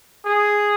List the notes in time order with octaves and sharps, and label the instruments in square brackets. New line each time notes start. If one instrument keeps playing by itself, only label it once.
[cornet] G#4